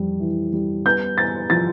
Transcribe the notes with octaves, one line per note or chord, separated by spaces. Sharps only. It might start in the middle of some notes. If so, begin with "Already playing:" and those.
Already playing: F2 G3
E3
G3
B3 G6
B3 A6
F3 A6